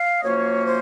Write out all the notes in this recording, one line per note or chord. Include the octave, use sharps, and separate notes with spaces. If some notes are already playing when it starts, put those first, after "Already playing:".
Already playing: F5
D#5
F#2 F3 A#3 C#4 C#5
C5